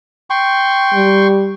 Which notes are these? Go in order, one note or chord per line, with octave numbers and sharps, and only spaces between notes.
G5 C6 C#6
G3